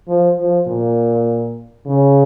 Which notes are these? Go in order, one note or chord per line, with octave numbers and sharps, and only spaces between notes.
F3
F3
A#2
C#3